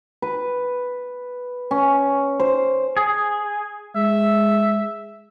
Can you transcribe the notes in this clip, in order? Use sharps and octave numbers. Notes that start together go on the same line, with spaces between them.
B4
C#4
C5
G#4
G#3 E5